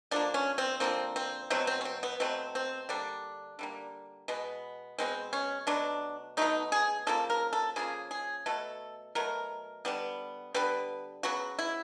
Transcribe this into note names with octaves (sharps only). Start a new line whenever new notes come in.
D3 F3 A#3 D4
C#4
C4
D3 F3 A#3 C4
C4
B2 F#3 A3 C4
C4
C#4
C4
B3
B2 F#3 A3 C4
C4
D3 G3 A#3 D4
D3 G3 A#3
B2 G#3 B3
B2 G#3 B3 C4
C#4
B2 F#3 A3 D4
B2 F#3 A3 D#4
G#4
C#3 F3 A#3 A4
A#4
A4
C#3 F3 A#3 G#4
G#4
B2 F#3 A3 A4
B2 F#3 A3 A#4
D3 G3 B3
D3 G3 B3 B4
C#3 F#3 B3 F#4
E4